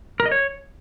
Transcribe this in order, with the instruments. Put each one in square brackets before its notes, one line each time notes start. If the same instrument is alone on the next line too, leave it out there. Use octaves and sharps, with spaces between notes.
[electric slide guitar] A#4
D#5
C#5